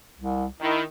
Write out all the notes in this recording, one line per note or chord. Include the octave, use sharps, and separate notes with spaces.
C2
D#3 E4